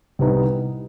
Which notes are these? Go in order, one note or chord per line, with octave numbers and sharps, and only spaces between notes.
C2 C3 G3 B3 D#4